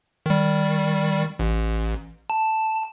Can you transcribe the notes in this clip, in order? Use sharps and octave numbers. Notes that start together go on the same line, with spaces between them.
D#3 G3
A1
A5